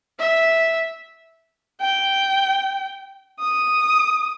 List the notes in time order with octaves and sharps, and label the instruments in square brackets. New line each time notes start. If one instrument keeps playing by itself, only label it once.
[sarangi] E5
[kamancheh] G5
D#6